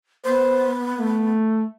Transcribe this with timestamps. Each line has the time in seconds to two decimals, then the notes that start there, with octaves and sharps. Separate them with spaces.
0.25 B3 C5
0.99 A3